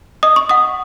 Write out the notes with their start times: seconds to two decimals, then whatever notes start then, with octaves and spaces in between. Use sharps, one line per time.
0.23 D#5 D#6
0.36 C#6
0.49 F#5 D#6